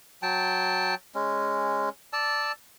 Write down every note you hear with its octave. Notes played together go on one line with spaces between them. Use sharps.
F#3 G5 A5
G#3 C#4
D5 A5 E6